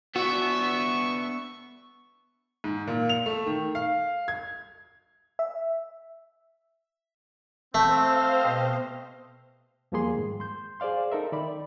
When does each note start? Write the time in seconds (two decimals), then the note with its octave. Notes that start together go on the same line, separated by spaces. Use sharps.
0.16 B3 D4 F#4 E5 C#6
2.64 G#2
2.87 A#2
3.09 F7
3.26 A3
3.46 D#3
3.75 F5
4.28 G#6
5.39 E5
7.74 A3 C4 C5 F5
8.43 B2 G4 B4 D#5
9.92 E2 F3 G3 A#3 G#4 C6
10.14 G#2 D#3
10.40 C6 G6
10.80 G#4 C5 D5 F5 C6
11.12 D#4 A4 A#4 E5
11.33 D#3 D5 B5